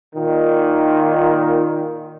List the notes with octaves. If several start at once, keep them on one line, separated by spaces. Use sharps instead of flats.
A#2 D#3